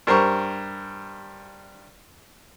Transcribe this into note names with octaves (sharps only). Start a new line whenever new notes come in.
G2 A#4 C5 C#6